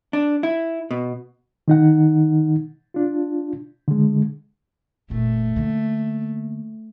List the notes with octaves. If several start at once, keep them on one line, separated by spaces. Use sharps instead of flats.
D4
E4
B2
D#3 D#4 F#5
D4 F4
D3 G#3
F1 A#2 A3
D3 A#3